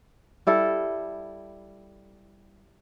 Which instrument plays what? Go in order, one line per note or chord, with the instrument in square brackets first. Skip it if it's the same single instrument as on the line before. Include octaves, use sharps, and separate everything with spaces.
[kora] G3 E4 A4